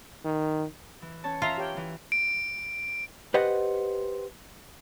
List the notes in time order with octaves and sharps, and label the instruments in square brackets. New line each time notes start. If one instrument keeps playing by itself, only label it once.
[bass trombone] D#3
[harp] E3
C#4 C#5 A5
[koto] F4 [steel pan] E5 F5 A#5
[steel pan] G4 C#5 G5
[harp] E3
[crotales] D7
[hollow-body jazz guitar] G4 B4 C5 D#5 F#5